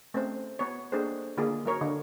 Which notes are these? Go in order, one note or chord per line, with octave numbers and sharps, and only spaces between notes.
A3 C4 C#4 C5
B3 C#5
A#3 D4 G#4 A4 C5
D3 A#3 F4 G#4
F#3 F4 A#4 C#5
D3